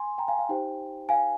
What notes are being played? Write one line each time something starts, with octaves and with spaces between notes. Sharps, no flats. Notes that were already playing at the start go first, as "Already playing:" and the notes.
Already playing: G#5 C6
G5 A#5
F5 G#5
F5
D#4 G4 C5 G5
F5 G#5